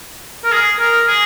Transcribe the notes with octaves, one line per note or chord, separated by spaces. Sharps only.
A#4
G#4
A#4
G#4